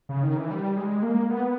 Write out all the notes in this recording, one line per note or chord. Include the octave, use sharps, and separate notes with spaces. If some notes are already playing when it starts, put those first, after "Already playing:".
C#3
D#3
E3
G3
G#3
A#3
B3